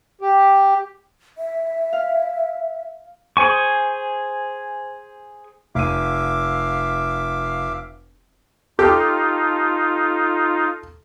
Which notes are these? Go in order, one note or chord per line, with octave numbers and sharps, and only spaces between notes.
G4
E5
F5
G#4 C5 G#5 C#6
F1 E5 F5 D6 D#7
D#4 F4 G4 A4 F6